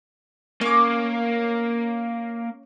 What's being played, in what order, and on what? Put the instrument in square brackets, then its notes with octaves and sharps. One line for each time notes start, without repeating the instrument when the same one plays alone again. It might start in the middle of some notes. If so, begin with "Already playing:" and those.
[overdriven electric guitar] A#3 [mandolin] C#4 D6